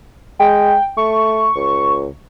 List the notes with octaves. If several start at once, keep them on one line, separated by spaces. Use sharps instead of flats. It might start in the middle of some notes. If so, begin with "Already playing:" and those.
G#3 G5
A3 C#6
C#2